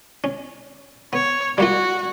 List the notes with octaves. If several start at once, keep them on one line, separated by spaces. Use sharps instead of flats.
C#4
B3 C#5
G3 A#3 F4 F#4